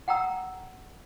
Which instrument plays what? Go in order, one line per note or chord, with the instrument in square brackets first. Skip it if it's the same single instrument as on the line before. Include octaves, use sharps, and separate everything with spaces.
[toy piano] F#5 G5 A#5 E6